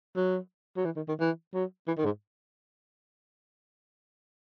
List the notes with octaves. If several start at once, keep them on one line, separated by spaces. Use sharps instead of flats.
F#3
F#3
E3
D#3
D#3
E3
F#3
E3
D#3
G#2